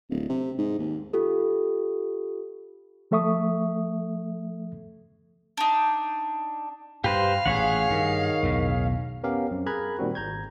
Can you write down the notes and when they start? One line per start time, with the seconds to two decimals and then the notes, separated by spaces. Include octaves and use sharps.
0.10 D1
0.29 C3
0.58 G#2
0.79 D#2
1.13 F4 G4 A4
3.11 F3 A3 A4 E5 C#6 D#6
5.57 D4 D#4
7.04 G2 G4 B4 C5 F5
7.46 A1 A#2 G#4 C#5 F#5
7.90 G2 D#3
8.43 B1 E2 A2
9.23 B3 C#4 G4 A#4 F5
9.51 F#2 C4
9.66 G#4 A#4 A#5 B5 F#6 G#6
9.99 A#2 D#3 G3 C4 F#4
10.15 G#1 A#5 G6 G#6